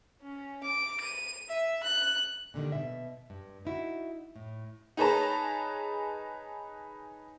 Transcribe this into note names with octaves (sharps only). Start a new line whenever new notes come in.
C#4
D6
D#7
E5
F#6
A#2 D3 D#3 G3
B2 E5
G2
D#4 E4 F#4
A2
D#4 G#4 B4 C#5 A5 A#5